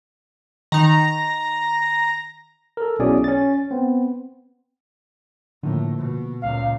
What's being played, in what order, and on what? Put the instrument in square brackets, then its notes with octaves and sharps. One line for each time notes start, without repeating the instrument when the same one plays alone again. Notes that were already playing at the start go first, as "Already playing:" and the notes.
[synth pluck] D#3 D#4 [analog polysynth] A#5
[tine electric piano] A4 A#4
B1 B2 C#4 E4 G#4 D5
C#4 A6
B3 C4
[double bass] A2 [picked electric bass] D3 F3 A#3
[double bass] B2
[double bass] C#2 A#2 [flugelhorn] F5